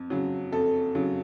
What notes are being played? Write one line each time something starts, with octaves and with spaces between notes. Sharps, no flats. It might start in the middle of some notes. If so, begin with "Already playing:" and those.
Already playing: F2
C#3 F#3
F2 A4
C#3 F#3